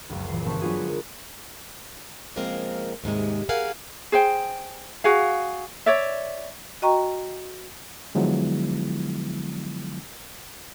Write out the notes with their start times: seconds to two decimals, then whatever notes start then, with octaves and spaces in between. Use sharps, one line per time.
0.09 F#1 C#2
0.28 A#2 E3 C7
0.45 G1 B3 C4 A5 C#6
0.61 F#3 B3 D4 F4 F#4 G#4
0.78 G#3 A#4
2.36 C#3 F3 G#3 A#3 C4 A#4
3.04 D#2 G#2 C3 G#3
3.49 G#4 A#4 F5 F#5 G#5
4.12 G#4 C5 G5
5.04 F#4 G#4 F5
5.86 C#5 D5 E5
6.82 F#4 D#5 G5 A#5 C#6
8.15 D3 F3 F#3 G#3 B3 E4